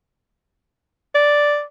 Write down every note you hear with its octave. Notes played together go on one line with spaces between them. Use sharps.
D5